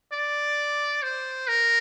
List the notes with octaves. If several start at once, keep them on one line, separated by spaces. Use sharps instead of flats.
D5
C5
A#4